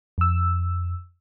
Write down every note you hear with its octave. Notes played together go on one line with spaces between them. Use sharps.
F2 E6